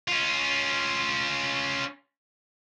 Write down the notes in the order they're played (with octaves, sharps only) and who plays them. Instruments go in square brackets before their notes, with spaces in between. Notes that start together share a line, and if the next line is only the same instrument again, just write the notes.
[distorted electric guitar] C#4 F4